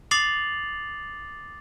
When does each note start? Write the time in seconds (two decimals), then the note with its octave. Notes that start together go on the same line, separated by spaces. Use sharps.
0.11 D6 D#6 A6 C7 F7 F#7